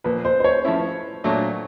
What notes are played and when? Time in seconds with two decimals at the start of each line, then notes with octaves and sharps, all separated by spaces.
0.04 A#2 F3 A#3 B4
0.25 C5
0.40 C5
0.44 C#5
0.65 F3 A3 C#4 E4
1.24 A#2 F#3 A3 D4